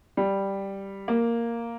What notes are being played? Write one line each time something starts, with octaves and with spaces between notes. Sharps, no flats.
G3
A#3